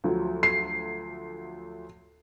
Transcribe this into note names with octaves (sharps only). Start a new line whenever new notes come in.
D2 F3 F#3
C7